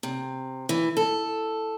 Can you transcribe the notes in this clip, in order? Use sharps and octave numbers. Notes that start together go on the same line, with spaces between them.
C3
E3
A4